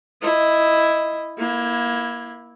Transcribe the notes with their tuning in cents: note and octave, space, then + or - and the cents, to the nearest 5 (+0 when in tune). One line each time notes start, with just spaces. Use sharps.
E4 +0 D#5 +0
A#3 +25 E4 -5